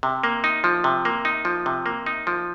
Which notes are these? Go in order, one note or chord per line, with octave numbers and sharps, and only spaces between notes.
C3
A#3
D#4
F3
C3
A#3
D#4
F3
C3
A#3
D#4
F3